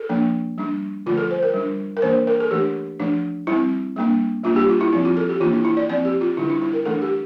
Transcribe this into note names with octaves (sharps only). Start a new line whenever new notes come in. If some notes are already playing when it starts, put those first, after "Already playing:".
Already playing: A4
F3 A#3 D4
G3 D4
D3 F3 A3 F4
A4
C5
A#4
G3 D4
A#4
E3 A#3 D4 C5
A#4
A4
E3 A3 D4 G4
F3 A3 D4
G3 C4 E4
G3 A#3 D4
G3 A#3 D4 F4
G4
F4
E4
F3 C4 E4
F4
A4
G4
E3 A#3 D4 F4
E4
E4
D5
F3 C4 D5
G4
F4
D3 G3 D4 E4
E4
E4
A#4
E3 A3 D4 A4
G4